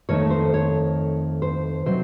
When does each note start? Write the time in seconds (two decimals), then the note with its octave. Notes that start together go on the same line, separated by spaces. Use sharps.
0.09 F2 D#3 A3 C#5
0.30 C5
0.54 C#5
1.42 C5
1.86 C3 F#3 C5